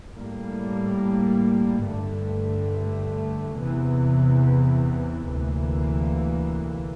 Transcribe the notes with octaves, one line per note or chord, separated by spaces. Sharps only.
A2 G3 A#3
G2 D3 A3
E2 C3 E3
D2 C3 E3 A#3